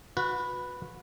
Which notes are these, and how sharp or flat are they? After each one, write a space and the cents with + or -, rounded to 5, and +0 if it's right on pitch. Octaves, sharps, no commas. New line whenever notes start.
F#4 -30 B4 +0